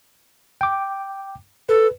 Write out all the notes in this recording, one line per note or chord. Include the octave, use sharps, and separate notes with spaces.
G5 D6
A4 B4